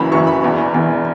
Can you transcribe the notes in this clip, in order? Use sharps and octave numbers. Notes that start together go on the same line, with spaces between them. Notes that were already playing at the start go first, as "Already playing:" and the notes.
Already playing: F#1 F#2 E3 B5
F#1 F#2 E3 C#6
B5
E1 E2 E3
E1 E2 E3